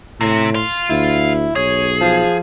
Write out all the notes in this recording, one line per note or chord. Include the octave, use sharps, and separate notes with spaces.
A2 C3
F5 C6
D2 E4
B1 G#4 C#5
F3